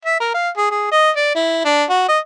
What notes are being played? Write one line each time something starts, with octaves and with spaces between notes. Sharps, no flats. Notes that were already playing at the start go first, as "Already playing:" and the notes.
E5
A#4
F5
G#4
G#4
D#5
D5
E4
D4
F#4
D#5